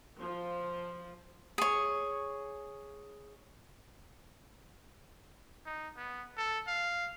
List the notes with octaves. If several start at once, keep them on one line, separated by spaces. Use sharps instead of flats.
F3
G#4 C#5
D#4
B3
A4
F5